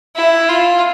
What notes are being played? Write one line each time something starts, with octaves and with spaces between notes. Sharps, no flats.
E4
F4